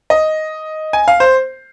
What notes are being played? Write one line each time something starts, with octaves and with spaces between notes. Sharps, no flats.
D#5
G#5
F5
C5